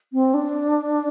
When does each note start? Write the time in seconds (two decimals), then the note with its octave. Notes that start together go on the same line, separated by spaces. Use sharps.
0.13 C4
0.34 D4